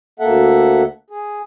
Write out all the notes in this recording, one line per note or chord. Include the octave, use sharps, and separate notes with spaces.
D2 A#3 A4 E5 F#5
G#4